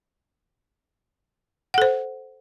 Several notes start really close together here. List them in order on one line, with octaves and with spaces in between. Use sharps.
F#5 A4 C5